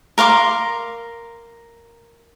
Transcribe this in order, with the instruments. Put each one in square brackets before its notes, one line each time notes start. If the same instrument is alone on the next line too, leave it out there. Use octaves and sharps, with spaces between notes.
[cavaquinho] A#4 F5 C6 D6